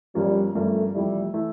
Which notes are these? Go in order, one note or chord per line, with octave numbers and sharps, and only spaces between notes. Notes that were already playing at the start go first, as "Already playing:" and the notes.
G1 G2 F3 G3 A#3 C#4
G1 G2 F3 A3 A#3 C#4
F1 F2 E3 G3 A3 E4
E3 A3 E4